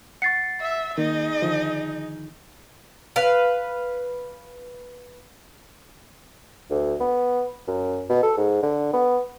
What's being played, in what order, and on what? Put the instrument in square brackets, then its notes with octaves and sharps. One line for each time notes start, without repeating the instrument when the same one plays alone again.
[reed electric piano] F#5 C#6 [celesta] A6 C7 C#7
[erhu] E5
[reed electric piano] D#3 A#3 [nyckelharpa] D#4 G#4 [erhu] D#5
[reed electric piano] D3 D#3 F3
[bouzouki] B4 F5
[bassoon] D2
B3
F#2
B2
A4
G#2
D3
B3